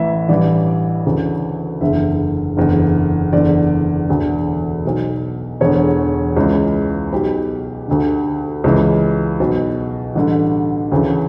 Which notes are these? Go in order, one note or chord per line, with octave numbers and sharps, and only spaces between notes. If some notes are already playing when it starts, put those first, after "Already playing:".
Already playing: A1 A2 E3 E5
A1 G2 E3 D5
D2 C#3 E3
F#1 E2 D3 E5
F#1 E2 D3
F#1 E2 D3 D5
E1 D2 D3
B1 B2
E1 E2 D3 C#5
C#2 C#3 E3
B1 B2 G4
D2 D3
C#2 C#3 E3
B1 B2
A1 G2 D3
D2 C#3 E3